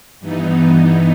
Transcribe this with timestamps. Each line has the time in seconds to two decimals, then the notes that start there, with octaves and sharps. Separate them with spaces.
0.20 G2 E3 B3 D#4